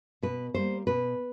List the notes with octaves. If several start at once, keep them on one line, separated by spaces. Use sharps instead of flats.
B2 B4
G3 A#3 C5
B2 B4